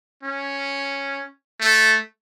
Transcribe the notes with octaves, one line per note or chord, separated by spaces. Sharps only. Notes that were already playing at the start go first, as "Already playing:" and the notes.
C#4
A3